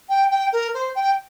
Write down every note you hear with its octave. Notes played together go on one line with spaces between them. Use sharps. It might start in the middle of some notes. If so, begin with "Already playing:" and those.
G5
G5
A#4
C5
G5